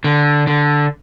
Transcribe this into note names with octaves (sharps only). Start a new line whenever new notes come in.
D3
D3